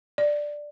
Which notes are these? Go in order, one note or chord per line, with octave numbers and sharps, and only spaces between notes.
D5